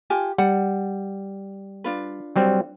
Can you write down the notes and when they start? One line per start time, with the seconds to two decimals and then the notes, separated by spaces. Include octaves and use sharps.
0.10 F4 G4 G#5
0.38 G3 F#5
1.84 D4 F4 B4
2.36 F#3 G3 C4